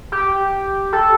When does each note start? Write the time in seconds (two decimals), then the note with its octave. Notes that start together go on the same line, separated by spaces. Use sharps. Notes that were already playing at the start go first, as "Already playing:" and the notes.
0.12 G4
0.93 A4